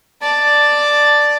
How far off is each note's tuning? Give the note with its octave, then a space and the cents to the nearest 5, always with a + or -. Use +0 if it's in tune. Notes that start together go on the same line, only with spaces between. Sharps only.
D5 +0 A5 +0